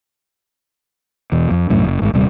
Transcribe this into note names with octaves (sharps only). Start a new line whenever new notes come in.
E2 B2
F2
C2 F#2 A2
F#1
G#1 G#2
D#1 C3 G3